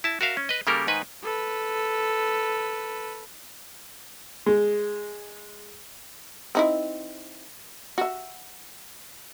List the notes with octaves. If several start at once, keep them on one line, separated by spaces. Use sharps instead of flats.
E4 A5
F#4 A#4 E5 F5
C#4
B4 D#5
C#3 G3 A#3 G4 A4 A#4
G#2 D#3 D#4 B4 G#5
A4 B4
G#3
C4 D#4 E4
F#4 E5